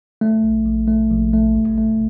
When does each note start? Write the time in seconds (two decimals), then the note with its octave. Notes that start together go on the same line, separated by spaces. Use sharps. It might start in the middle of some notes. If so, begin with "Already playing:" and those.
0.21 A3
0.44 A#1
0.65 A#1
0.87 A3
1.10 A#1
1.33 A3
1.55 A1
1.78 A3